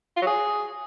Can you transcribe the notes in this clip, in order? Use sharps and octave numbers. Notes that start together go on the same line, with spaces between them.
F4
F#3
G#4